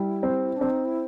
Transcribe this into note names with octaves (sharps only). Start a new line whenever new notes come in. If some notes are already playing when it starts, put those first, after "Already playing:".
Already playing: G3 E4
C4
C4 D4
D#4
E4